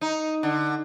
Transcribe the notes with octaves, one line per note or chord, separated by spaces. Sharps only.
D#4
D3